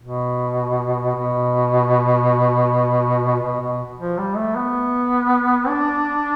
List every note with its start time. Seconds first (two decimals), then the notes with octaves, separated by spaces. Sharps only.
0.01 B2
1.15 B2
3.42 B2
3.60 B2
3.99 F3
4.18 G3
4.36 A3
4.56 B3
5.68 D4